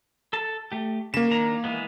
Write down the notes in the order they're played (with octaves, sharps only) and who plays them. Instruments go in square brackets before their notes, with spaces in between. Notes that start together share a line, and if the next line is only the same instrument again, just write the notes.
[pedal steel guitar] A4 A5
A3 G4
[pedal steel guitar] C#3 [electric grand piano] A#3 E7
[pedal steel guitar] D#3 D4 A#5
E3 G#3 B3